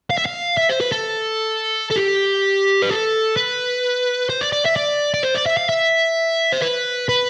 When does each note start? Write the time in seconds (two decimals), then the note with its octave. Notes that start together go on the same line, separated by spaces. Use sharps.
0.10 F5
0.18 E5
0.26 F5
0.58 E5
0.69 C5
0.81 B4
0.92 A4
1.91 A4
1.97 G4
2.82 B4
2.91 A4
3.37 B4
4.29 C5
4.41 D5
4.53 D5
4.65 E5
4.76 D5
5.14 D5
5.23 C5
5.35 D5
5.46 E5
5.57 F5
5.69 E5
6.52 C5
6.62 B4
7.09 B4